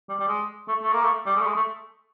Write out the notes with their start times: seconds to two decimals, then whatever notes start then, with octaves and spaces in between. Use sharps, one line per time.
0.09 G3
0.20 G3
0.28 G#3
0.68 A3
0.83 A3
0.93 A#3
1.03 A3
1.26 G3
1.36 G#3
1.41 A3
1.46 G#3
1.56 A3